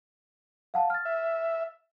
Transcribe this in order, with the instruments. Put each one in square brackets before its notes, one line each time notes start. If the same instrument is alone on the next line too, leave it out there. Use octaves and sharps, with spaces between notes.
[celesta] F5 F#5 A5
F6 A6
[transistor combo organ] E5